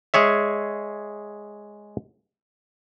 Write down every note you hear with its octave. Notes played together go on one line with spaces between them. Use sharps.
G#3 G#4 C#5 E5